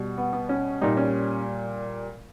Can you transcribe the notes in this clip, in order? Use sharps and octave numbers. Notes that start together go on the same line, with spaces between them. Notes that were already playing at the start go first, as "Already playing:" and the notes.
Already playing: B2 G3
B3
B3
C#4
A#2 G3 D#4
C#4